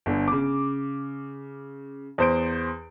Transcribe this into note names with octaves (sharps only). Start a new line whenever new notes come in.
G1 D3
C#3 D6
E2 C5 D7